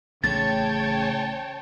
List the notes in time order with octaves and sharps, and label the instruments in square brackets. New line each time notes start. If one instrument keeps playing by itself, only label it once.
[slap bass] A1 A3 [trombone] C#3 [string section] C#5 G5 A5 [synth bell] A6